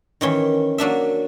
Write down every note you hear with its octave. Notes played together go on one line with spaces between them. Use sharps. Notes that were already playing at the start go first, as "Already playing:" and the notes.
D#3 E3 C#4 C#5
F#3 A#3 D4 E5